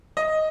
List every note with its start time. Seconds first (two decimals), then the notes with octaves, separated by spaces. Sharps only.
0.17 D#5